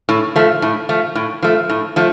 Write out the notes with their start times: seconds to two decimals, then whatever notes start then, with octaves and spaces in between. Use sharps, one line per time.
0.09 A2
0.36 F3 A3
0.62 A2
0.89 F3 A3
1.15 A2
1.42 F3 A3
1.70 A2
1.96 F3 A3